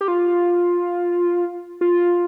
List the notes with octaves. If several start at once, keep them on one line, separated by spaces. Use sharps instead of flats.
G4
F4
F4